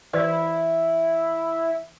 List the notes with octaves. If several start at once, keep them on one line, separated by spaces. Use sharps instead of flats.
E3 E4 B4 D5